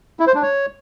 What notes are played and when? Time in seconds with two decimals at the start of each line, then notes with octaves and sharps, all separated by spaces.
0.20 E4
0.27 C5
0.35 D4
0.43 C#5